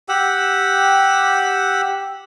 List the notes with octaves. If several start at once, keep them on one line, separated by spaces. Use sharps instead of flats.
G4 F#5 E6